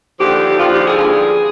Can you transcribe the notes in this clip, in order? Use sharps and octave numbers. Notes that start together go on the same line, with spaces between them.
D#2 D3 F3 G4
D#2 D3 F3 F4
G4
G#4
G2 D3 F3